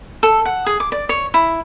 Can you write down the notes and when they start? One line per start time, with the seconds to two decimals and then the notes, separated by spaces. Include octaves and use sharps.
0.23 A4
0.45 F#5
0.66 G#4
0.80 D6
0.92 D5
1.09 C#5
1.34 E4